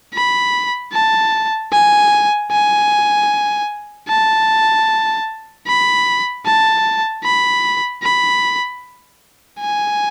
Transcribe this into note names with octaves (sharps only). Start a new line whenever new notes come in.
B5
A5
G#5
G#5
A5
B5
A5
B5
B5
G#5